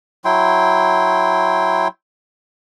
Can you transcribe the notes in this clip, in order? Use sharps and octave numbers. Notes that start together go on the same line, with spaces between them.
F#3 E4 G5 C6